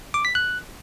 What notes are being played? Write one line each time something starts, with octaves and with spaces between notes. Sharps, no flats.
D6
B6
F#6